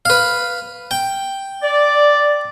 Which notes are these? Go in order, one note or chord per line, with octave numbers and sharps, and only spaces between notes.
B4 F5
G5
D5